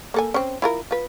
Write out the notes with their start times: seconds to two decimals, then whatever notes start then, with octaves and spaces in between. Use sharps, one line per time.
0.14 A#3 A4 G#5
0.34 C4 C#4
0.62 E4 F4 A#4
0.91 F4 B4